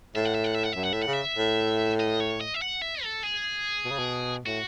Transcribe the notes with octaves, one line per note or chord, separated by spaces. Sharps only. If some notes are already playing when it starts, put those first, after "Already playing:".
A2 E5
F#5
E5
F#5
E5
F#5
F#2 E5
F#5
A2 E5
C#3 F#5
E5
A2
D#5
C#5
D#5
E5
F#5
E5
A4
G#4
B2
C#3
B2
A2 F#4